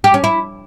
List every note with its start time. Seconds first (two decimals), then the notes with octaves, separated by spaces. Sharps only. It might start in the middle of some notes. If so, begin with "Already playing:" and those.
0.04 G4
0.14 C#4
0.24 E4